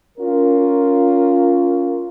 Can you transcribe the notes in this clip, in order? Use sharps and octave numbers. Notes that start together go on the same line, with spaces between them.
C#4 F4 A#4